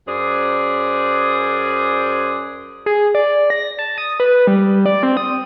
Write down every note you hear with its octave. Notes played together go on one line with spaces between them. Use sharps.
F#2 G#4 C5 D5
G#4
D5
A#6
A5
D#6
B4
G3
D5
C4
D#6